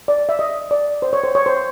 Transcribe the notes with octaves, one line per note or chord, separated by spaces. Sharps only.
D5
E5
D#5
D5
C5
C#5
C5
C#5
C5